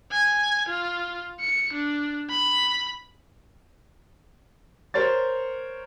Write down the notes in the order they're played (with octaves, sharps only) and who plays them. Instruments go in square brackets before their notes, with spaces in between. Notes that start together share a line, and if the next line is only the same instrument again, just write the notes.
[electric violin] G#5
F4
C#7
D4
B5
[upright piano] A#4 C5 C#5 A6